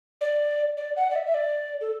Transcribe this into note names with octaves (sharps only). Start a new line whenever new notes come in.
D5
D5
F#5
D5
E5
E5
D5
A4